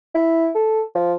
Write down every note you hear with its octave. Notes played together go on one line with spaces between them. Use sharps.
E4
A4
F3